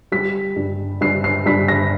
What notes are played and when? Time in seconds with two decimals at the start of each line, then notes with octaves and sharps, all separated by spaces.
0.12 G3 B6
0.56 G2
1.01 G2 C7
1.24 C7
1.46 G2 B6
1.68 A#6